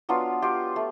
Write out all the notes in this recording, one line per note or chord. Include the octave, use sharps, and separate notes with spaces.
F#3 B3 D4 F4
F4 G4
A3